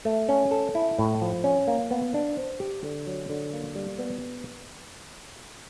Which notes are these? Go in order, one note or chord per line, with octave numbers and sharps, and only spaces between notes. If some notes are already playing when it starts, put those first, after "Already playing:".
A3
C#4
A4
E4
A2
F3
C#4
A#3
B3
D4
C5
G4
D3
F#3
D3
A#3
G3
B3